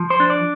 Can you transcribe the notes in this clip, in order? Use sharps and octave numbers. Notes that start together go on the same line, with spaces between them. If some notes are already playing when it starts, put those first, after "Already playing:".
Already playing: F3
C5
D4
D5